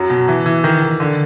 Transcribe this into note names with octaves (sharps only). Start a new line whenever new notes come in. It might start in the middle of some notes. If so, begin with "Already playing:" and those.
Already playing: F#2 F#3
B2
E3
E3
D#3
D#3
D3